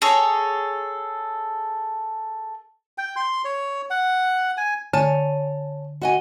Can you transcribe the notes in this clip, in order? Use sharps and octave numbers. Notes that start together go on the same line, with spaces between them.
G#4 A4 C#5 A#5
G5
C6
C#5
F#5
G#5
D3 C#5 G#5 A5
F#4 D#5 G#5